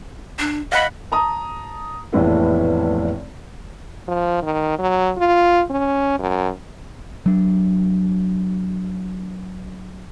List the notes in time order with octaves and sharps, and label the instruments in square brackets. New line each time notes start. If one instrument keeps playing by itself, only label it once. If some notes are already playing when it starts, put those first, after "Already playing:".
[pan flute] D4
[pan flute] D#5 [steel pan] F5 F#5 B5
[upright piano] A5 A#5 D#6
F1 A#1 A2 E3 B3 E4
[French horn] F3
D#3
F#3
F4
C#4
F#2
[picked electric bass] F#3 D4